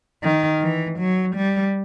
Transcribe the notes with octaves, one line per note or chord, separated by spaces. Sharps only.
D#3
E3
F#3
G3